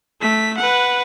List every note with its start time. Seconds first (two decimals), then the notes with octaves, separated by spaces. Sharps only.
0.21 A3 B6
0.57 B4 F#5